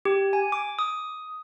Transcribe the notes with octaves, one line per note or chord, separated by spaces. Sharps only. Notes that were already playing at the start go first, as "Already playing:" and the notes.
G4
G#5
D6
D#6